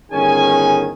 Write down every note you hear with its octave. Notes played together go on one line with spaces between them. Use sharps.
G1 D#3 C#4 G#4 G#5